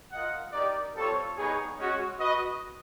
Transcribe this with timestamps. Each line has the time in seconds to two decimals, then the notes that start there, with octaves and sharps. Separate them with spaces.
0.12 F4 A#4 D#5 F#5
0.52 D#4 G4 A#4 D5
0.94 G3 C4 F4 A4 C#5
1.36 G3 B3 D#4 G#4 C#5
1.78 G#3 C#4 F#4
2.19 F#4 B4 D#5